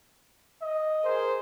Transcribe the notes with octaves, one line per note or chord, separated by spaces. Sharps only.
D#5
G#4 A#4 C5